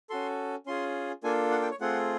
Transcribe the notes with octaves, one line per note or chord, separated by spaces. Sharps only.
C#4 F#4 A4 C6
C#4 F4 G#4 C6
A#3 D4 F4 A4 G#5
F#5
G5
C#5
A3 C4 F4 G#4 F#5